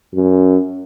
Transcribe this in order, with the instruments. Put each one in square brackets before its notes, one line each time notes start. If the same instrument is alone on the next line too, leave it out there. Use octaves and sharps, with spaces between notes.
[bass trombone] F#2